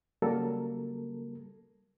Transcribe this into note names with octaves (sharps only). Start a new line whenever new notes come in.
C#3 F#3 G3 A#3 A4 A#4